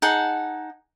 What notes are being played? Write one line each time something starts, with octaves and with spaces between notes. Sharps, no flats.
D#4 G#4 F#5 A5